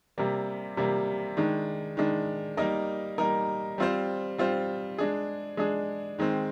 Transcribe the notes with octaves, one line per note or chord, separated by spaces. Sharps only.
C3 G3 A#3
C3 G3 A#3
D#3 G#3 D4
D#3 G#3 D4
G3 A#3 D#4 A#4
G3 A#3 D#4 A#4
G3 C4 F4 C5
G3 C4 F4 C5
G#3 D4 G#4
G#3 D4 G#4
D#3 G#3 C4